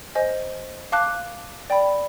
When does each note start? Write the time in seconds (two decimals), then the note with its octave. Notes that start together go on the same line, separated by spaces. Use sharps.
0.15 C5 D#5 G#5
0.92 F5 A5 D6 F#6
1.70 D5 G5 B5